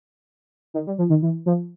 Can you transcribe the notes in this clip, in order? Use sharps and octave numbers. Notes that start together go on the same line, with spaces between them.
D#3
G3
F3
D#3
E3
F3